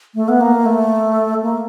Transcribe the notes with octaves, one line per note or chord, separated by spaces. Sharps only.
A3
B3
A#3
A3
A#3